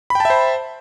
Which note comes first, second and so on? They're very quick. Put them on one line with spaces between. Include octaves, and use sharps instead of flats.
B5 G5 A5 E5 C5